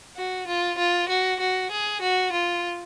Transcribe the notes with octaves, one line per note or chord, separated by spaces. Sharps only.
F#4
F4
F4
F#4
F#4
G#4
F#4
F4